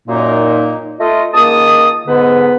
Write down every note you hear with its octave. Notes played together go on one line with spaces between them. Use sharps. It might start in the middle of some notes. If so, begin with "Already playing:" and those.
F#2 A#2 A#3 D#4
A3 F4 D#5
C#2 D#3 A#3 A5 D#6
G#2 D3 B3 B4